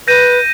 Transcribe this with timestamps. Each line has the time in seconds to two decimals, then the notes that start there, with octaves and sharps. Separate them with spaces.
0.08 B4 G6 A#6 D#7